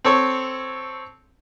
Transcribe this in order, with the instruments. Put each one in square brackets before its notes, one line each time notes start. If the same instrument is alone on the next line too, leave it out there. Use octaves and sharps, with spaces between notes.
[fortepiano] C4 A4 C#5